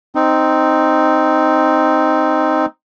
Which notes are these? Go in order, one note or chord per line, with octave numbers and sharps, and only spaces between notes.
C4 D#4